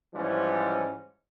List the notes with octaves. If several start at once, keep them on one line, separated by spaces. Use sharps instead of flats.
G#2 E3 F3 G3 C#4